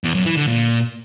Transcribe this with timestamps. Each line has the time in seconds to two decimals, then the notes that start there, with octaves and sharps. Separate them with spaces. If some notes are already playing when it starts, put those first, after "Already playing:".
0.04 E2
0.15 F#2
0.26 E3
0.37 D3
0.48 A#2